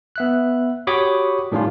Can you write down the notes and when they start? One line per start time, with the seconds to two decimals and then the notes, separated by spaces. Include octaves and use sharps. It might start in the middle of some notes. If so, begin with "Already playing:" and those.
0.16 B3 E5 F#6
0.87 F#4 G4 C#5 B5 D6 D#6
1.52 A2 D#3 G3 C#4 F4